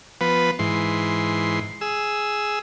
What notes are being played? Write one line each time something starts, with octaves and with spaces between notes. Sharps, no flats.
F3 B3 B4
G#2 E3 C6
G#4 E6